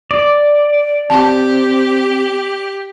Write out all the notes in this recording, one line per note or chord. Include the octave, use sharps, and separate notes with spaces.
D5
C4 G4 A5